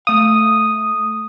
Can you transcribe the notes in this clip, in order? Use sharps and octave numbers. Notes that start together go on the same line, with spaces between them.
A3 F5 D#6